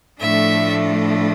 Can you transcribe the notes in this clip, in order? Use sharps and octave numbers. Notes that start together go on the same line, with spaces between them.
A2 F3 A3 D4 E5